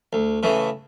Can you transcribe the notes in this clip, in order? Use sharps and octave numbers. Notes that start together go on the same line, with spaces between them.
D2
C#3 E3 A3